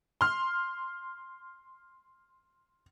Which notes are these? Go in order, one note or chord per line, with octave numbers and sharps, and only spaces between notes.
C6 F6